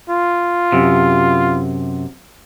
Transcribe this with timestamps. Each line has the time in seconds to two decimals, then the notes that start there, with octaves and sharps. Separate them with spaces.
0.10 F4
0.72 F#2 C3